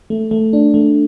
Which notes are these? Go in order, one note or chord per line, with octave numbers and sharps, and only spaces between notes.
A3
A3
D4
A3